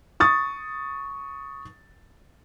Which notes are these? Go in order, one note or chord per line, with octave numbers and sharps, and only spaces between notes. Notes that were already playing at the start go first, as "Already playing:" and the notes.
C#6 D#6 A6